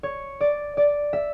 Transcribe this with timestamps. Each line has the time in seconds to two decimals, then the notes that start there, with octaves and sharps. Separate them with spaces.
0.03 C#5
0.41 D5
0.77 D5
1.13 E5